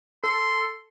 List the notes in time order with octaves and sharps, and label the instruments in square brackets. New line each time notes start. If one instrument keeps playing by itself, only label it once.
[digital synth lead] A4 [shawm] C6